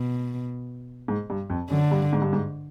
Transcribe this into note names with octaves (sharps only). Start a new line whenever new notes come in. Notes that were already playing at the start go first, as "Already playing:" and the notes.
Already playing: B2
G#2
G2
F2
F#2 D3
G2
G#2
G2
G#2